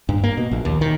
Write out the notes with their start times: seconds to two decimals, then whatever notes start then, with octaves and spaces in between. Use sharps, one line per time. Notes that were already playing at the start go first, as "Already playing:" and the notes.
0.09 G2
0.24 A#3
0.37 B2
0.51 A#1
0.65 D#2
0.81 D#3